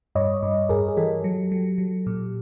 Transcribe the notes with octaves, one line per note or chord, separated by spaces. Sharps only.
G2 C#5 D#5
G2
G2 G#4 A#4
G#4
E3 G4 A4
F#3
F#3
F#3
A#2